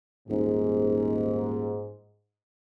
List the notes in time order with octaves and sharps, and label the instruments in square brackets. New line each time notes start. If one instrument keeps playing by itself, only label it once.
[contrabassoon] D#1 [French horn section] G#2